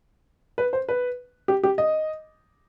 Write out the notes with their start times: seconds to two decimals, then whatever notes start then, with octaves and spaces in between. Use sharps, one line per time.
0.58 B4
0.73 C5
0.89 B4
1.48 G4
1.63 G4
1.78 D#5